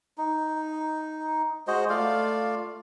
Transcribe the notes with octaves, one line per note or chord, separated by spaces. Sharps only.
D#4
G#3 F#4 C5 D#5
A3 F4 D5 F5